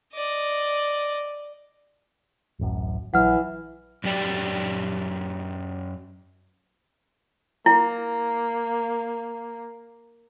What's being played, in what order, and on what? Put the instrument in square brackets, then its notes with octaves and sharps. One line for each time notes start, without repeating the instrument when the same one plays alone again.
[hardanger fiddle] D5 D#5
[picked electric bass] D1 A1 F#2
[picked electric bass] A#1 F#3 [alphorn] E3 [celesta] F#5 F6
[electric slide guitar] F#2 F#3 G4 D5
[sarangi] A#3 [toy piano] E4